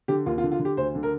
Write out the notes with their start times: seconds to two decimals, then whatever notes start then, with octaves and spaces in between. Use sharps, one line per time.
0.08 D3 G4
0.26 D#2 F4
0.38 F4
0.43 D3
0.52 F4
0.59 D3
0.65 G4
0.77 D2 C5
0.95 D3
1.03 A#4